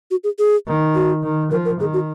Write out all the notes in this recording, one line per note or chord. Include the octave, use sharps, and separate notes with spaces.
F#4
G#4
G#4
D#3
F#4
D#3
F3 A#4
A#4
D#3 G#4
F#4